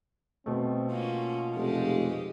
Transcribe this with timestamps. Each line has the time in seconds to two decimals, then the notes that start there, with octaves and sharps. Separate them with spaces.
0.46 B2 A3 C4
0.91 A#3 C#4 F4
1.56 F1 G#3 G4